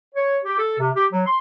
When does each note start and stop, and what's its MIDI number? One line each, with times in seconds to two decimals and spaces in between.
0.15 0.37 73
0.45 0.57 67
0.59 0.75 69
0.79 0.89 48
0.96 1.06 67
1.12 1.22 54
1.25 1.37 84